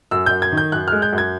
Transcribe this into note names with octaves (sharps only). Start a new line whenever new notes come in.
F#2 E6
F#2 G6
G#6
D#3
G6
F#2 F#6
G#3 F6
G6
F#2
G#6